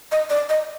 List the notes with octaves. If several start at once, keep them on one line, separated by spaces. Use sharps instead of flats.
D#5
D5
D#5